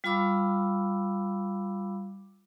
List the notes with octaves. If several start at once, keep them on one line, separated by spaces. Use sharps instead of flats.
G3 F4 F5 B5 D6 E6